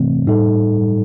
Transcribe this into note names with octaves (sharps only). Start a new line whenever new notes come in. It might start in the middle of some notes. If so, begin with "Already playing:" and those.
Already playing: C3 E3 A3 C4
A2 G3 D#4 A4